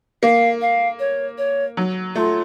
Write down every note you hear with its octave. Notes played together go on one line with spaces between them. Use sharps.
A#3 F5
F5
C#5
C#5
F#3
A3 F4